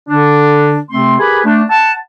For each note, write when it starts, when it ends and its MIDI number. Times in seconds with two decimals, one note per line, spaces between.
0.09 0.79 50
0.09 0.79 62
0.90 1.18 48
0.90 1.18 57
0.90 1.18 60
0.90 1.18 84
1.19 1.43 67
1.19 1.43 68
1.19 1.43 70
1.19 1.43 71
1.19 1.43 80
1.19 1.43 83
1.45 1.62 57
1.45 1.62 62
1.69 1.92 78
1.69 1.92 81